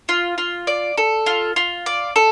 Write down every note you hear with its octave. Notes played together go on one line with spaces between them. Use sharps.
F4
F4
D5
A4
F4
F4
D5
A4